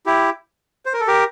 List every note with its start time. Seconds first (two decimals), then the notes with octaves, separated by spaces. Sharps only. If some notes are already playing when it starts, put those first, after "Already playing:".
0.06 E4 G4
0.86 C5
0.94 A#4
1.00 A4
1.07 G4 A#4